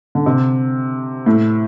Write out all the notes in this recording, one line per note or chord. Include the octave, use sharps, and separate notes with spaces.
D3
C3
A2